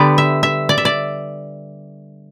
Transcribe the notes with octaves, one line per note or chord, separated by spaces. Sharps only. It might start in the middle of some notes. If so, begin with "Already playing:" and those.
Already playing: D3 G3 B3 D5
E5
E5
D5
E5
D5